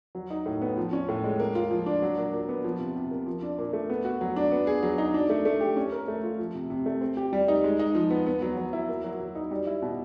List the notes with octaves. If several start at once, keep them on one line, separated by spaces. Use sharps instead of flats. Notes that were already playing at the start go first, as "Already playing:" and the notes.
F#3
D#4
A2
B3
F3
C#4
A2
G#3
A#3
F4
F3
D4
F#3
A#2
A#2
B3
F3
C3
C3
A#3
F3
D4
A#2
A3
B3
F#4
F#3
D4
B3
G#4
F#3
D#4
D4
A3
A3
G4
C#4
A#4
A3
F4
F3
C3
C3
A3
C4
G4
G3
D#4
G#3
D#4
F3
B3
B3
F#3
F#3
E4
A#3
F#3
F#3
D#4
G3
E4
B2